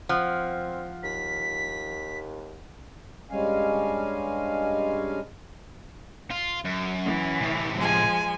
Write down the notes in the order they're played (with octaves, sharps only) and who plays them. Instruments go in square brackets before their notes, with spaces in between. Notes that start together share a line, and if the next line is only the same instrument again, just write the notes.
[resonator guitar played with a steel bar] F3 [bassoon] C4 [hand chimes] F#5 F6 F#6
[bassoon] D#2 [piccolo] B6
[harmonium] G2 G3 G#3 C#4 F5 G#5
[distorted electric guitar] F4
F#2
[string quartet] E3
[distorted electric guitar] A2 C3
[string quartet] F3 G#3 G#5